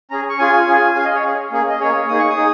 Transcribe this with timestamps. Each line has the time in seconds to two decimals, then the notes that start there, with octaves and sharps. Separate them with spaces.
0.10 C#4 G#4 A#5
0.29 C#6
0.39 C#4 F4 G#4 G#5
0.67 C#4 F4 G#4
0.95 C#4 G#4 F5
1.05 D#5
1.15 C#5
1.23 C#4 G#4
1.51 A#3 C#4 G#4
1.69 D#5
1.80 A#3 C#4 G#4 C#5
2.08 A#3 D#4 G#4 D#6
2.19 C#6
2.29 D#6
2.37 D#4 G#4